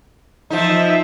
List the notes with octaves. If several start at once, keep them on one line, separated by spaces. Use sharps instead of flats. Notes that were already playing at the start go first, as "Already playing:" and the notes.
F3 D#4 E5